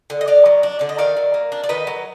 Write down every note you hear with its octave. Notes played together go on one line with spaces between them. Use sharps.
D3
D#5
D3 D5 F5
F#3
D4
D3 D5
D#5
D#3 D5 F5
F#3
A#3
D4
D5
D#3 B4 D#5
F#3